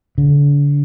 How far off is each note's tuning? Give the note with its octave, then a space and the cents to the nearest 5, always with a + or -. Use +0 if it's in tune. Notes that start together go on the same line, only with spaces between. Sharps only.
D3 -35